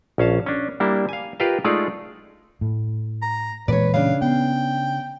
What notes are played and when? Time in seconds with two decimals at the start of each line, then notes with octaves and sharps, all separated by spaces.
0.18 A#1 C#4 F5 A5
0.46 C#4 D4
0.80 G3 A#3 D4 E4
1.09 F5 G#5
1.40 F4 G4 A#4 B4 D#5 F5
1.64 G#3 A3 D#4 F4 G#4 D5
2.61 A2
3.22 A#5
3.68 A#2 E3 G#3 B4 C#5 D5
3.94 C#3 D4 F5
4.22 B3 G5